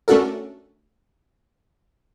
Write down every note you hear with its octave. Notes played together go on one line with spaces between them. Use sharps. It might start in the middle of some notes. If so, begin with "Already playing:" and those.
A3 C#4 D4 F#4 A4 A#4